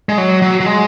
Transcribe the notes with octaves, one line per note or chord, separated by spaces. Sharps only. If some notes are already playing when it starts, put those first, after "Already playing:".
G#3
F#3
F#3
F#3
G#3